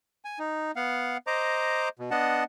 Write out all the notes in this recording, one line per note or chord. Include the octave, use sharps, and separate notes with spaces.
G#5
D#4
B3 F5 F#5
C5 D#5 A#5 D6
B2
B3 D4 D#5 F#5 A5